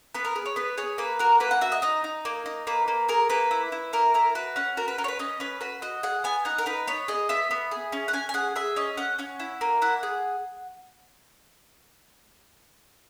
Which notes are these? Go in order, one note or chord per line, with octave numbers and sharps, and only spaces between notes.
B3 B4
A#4
G#4 B4
C#5
B3 B4
G#4 C#5
A#3 B4
F#4 A#4
A#3 B4
F#5
F#4 E5
D#5
D#4 D#5
D#4
A#3
D#4
A#3 B4
A#3
G#4 A#4
A#3 B4
E4
E4
A#3 A#4
E4 A#4
F#4 B4
C#4 F#5
F#4 A#4
B4
C#4 A#4
C#5
B4
C#4 D#5
C#4 B4
F#4 B4
F#4 D#5
G#4 F#5
B3 G#5
D#4 F#5
A#4
D#4 B4
B3 C#5
G#4 D#5
B3 E5
B3
G#4
C#4
F#5
C#4 G#5
G#5
G#4 F#5
G#4 E5
C#4 D#5
C#4 F#5
C#4 F#5
E4
A#3
E4 F#5
G#4